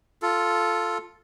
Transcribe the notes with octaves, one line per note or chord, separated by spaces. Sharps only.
F4 A4